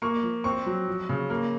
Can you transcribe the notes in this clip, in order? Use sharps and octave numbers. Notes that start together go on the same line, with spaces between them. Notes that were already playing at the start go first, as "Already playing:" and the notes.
A#3 C#6
F3
C4 C#6
F#3
F3
C#3
A#3